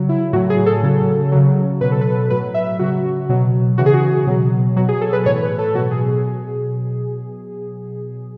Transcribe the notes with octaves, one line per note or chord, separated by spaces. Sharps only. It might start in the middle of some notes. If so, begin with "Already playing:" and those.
Already playing: C#3 F#3
E4
A2 F#3 F#4
G#4
A4
C#3 F#3
C#3 F#3
B2 F#3 B4
A4
B4
A2 F#3 B4
E5
C#3 F#3 F#4
B2 F#3
C#3 E3 F#4
G#4
F#4
B2 F#3
B2 F#3 F#4
G#4
A4
B4
A2 E3 C#5
B4
A4
B2 F#3 F#4
G#4